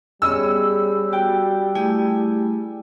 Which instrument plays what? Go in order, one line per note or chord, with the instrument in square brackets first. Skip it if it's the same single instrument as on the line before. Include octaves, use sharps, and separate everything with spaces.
[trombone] G3 [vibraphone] B3 G#4 C#5 [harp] C#4 D#5 [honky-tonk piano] E6
[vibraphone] F#4 [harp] G5
[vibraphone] A3 E4 G5 [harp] G4 G#4